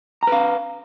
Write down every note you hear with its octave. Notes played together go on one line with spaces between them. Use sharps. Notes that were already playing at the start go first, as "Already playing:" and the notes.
B4 F5 A#5